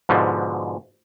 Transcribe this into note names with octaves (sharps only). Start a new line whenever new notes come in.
G#2 B2 D3 F3